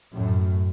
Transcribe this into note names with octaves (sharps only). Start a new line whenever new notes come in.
F#2 A2